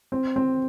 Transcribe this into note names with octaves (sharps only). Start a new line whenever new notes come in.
C4
C4